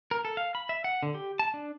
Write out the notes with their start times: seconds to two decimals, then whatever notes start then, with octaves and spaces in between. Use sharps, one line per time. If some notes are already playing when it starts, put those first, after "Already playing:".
0.11 A#4
0.25 A4
0.37 F5
0.55 B5
0.69 E5
0.84 F#5
1.03 D3
1.14 G4
1.39 A5
1.54 D4